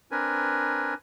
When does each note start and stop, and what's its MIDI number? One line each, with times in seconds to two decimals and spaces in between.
0.11 0.94 60
0.11 0.94 62
0.11 0.94 70
0.11 0.94 71
0.11 0.94 80